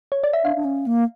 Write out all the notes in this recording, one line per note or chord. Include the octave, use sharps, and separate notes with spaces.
C#5
D5
E5
D4 F5
D4
C#4
A#3